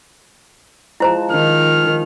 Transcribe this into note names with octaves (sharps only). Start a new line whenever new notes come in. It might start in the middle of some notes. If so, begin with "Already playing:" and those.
F3 G#3 E4 C5 A#5
D#3 F6